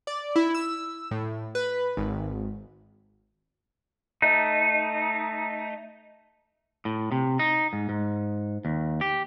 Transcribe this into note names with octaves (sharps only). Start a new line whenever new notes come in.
D5
E4
E6
A2
B4
G#1
A3 D#4
A2
C3
D#4
G#2
G#2
D#2
G4